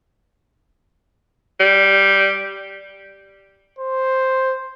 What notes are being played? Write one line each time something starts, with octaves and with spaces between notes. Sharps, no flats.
G3
C5